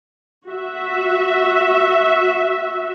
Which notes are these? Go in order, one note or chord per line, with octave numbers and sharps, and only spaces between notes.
F#4 E5